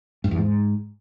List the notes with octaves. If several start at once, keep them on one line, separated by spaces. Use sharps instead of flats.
G2
E2
G#2